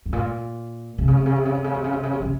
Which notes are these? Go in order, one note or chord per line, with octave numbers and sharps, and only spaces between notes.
G#2
A#2
C3
C#3
C3
C#3
C3
C#3
C3
C#3
C3
C#3
C3
C#3
C3
C#3